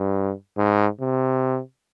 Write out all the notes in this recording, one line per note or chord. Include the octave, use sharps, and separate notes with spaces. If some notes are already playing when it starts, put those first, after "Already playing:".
Already playing: G2
G#2
C3